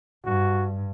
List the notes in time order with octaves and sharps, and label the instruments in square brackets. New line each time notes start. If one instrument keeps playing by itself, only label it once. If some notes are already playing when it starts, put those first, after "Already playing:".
[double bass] G2 [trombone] F#4